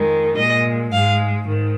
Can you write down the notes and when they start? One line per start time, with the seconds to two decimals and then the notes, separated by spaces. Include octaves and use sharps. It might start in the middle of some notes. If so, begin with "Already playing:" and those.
Already playing: F2 D#3 G#3
0.37 A#2 G#3 D#5
0.91 G#2 G#3 F5
1.46 G#2 D#3